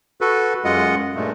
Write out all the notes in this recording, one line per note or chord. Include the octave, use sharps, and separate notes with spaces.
F#4 A4 B4
F#2 G#3 F4 D#5 F#5
G2 A#2 G#3 A3